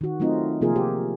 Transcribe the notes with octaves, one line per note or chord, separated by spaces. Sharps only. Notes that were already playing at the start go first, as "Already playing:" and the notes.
D#3 F#4
F#3 A3 C4 D#4 F4
C3 F3 A#3 F4 G#4 A#4
G4